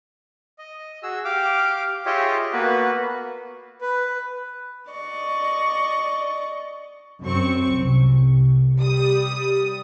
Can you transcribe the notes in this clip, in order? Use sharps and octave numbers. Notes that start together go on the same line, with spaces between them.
D#5
F#4 G#4 E6
G4 F5 D6
F4 G4 G#4 C#5 D#5 E5
A#3 B3 F#4 B4
B4
D5 D#5 C#6
F#2 C4 C#6
C2
G3 D#6